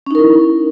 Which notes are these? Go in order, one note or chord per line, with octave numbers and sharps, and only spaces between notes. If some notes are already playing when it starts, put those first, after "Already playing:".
C#4 D#4 E4 A#4